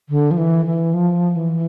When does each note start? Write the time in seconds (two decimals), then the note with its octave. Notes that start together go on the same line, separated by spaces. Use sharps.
0.09 D3
0.31 F3
0.37 E3
0.66 E3
0.94 F3
1.36 E3